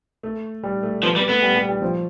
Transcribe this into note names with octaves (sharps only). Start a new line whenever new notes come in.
A3
G3
A3
F3 B3
G3 B3
A3 B3
G3
G3
G3
F3